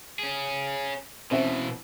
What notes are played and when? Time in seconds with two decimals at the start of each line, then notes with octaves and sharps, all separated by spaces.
0.19 C#4 G#4
1.31 B2 E3 C4 C#4 E5